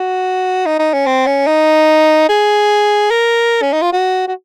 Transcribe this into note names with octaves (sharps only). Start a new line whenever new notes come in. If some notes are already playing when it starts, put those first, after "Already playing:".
Already playing: F#4
D#4
D#4
C#4
C4
C#4
D#4
G#4
A#4
C#4
D#4
F4
F#4
F#4